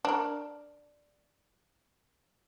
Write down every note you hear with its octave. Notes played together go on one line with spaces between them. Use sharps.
D4 A#4